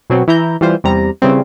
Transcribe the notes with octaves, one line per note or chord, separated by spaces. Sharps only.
B2 F#3 C4
E3 E4 A#5 G6
E3 G3 F4 C5
E2 C3 G3 A#5
C#3 E3 G3 C4